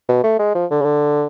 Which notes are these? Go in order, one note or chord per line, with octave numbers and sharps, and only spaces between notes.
B2
A3
G#3
F3
D3
C#3
D3